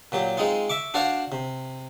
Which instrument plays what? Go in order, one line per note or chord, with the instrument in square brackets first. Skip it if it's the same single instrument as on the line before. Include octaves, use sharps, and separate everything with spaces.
[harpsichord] A#2 F#3 G4
G#3 C4 D#4 F4
E5 C#6 D6
D4 F#4 C5 D5 F5 F#5
C3